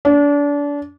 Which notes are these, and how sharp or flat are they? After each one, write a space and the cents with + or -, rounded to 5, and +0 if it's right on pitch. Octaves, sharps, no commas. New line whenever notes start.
D4 -30